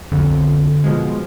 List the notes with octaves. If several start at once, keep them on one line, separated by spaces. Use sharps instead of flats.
B1 F2 D3
B2 F3 G#3